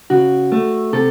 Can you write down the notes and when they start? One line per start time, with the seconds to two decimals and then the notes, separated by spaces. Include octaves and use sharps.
0.10 C#3 F#4
0.52 A3
0.93 C3 A4